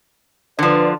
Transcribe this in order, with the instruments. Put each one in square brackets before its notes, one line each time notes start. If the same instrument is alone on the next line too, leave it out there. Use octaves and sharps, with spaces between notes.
[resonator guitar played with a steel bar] D3 F3 [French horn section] B4 D5